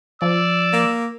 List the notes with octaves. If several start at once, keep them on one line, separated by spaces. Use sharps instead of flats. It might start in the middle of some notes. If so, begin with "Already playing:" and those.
F3 D5 E6
A#3